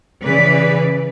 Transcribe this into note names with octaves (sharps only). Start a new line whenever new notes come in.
C#3 E3 B4 D5